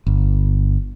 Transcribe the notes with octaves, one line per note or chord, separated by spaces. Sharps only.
G1